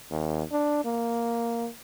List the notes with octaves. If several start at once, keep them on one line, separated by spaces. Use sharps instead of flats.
D#2
D4
A#3